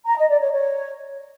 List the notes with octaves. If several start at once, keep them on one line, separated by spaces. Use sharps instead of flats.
A#5
D#5
D5
C#5
C#5